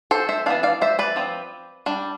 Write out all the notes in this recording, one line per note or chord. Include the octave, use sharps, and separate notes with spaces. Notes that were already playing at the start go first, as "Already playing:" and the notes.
A4 C5
C5 E5
E3 B3 D4 F5 A5
D5 F5
C5 E5
B4 D5
F3 C4
G3 D4